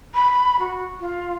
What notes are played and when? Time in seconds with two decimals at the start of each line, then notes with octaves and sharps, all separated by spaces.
0.14 B5
0.60 F#4
1.00 F4